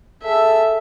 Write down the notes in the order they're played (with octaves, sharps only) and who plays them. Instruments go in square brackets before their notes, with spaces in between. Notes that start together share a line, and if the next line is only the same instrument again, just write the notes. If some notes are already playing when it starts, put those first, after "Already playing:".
[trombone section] G#4 A4 [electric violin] E5